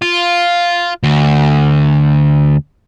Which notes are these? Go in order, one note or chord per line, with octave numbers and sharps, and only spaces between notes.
F4
D2